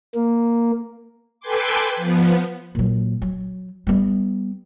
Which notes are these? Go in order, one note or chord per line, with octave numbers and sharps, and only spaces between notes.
A#3
A4 B4 G5 G#5 C6 D6
F3 B3
A#2 F#3
F#3
G3 B3